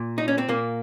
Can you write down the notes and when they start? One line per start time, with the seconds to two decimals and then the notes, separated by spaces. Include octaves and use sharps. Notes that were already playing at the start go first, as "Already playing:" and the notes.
Already playing: A#2
0.18 D#4
0.28 C#4
0.38 C4
0.49 A#2 A#3